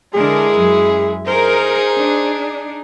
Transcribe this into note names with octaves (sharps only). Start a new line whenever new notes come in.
D3 G#3 E4 G#4 A#4
F#2
D#4 G#4 A#4 C5
D4